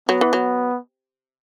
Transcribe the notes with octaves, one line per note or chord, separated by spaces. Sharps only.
F#3 B3
E3
F#3